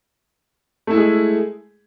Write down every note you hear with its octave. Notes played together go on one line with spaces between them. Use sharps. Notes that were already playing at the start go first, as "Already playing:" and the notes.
G#3 A3 E4 G#4